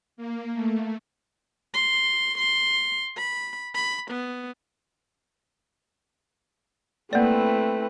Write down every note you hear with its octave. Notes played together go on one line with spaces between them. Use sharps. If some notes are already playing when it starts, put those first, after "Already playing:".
A#3
A3
C6
C6
B5
B5
B3
A3 A#3 C4 E4 B4 D5